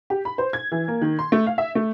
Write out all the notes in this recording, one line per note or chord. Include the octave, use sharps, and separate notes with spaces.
G4
B5
C5
G#6
E3
A#3
D#3
C6
A3
F5
E5
A3